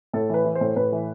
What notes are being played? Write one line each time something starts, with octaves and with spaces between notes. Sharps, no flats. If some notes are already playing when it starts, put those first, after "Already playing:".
A2 A4
E3 B4
E3
C5
A2
A2 B4
E3